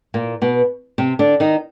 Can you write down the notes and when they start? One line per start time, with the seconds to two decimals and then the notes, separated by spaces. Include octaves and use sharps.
0.14 A#2 A#3
0.42 B2 B3
0.98 C3 C4
1.19 D3 D4
1.40 D#3 D#4